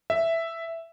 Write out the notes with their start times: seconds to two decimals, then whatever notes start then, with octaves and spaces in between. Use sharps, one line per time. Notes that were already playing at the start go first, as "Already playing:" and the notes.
0.10 E5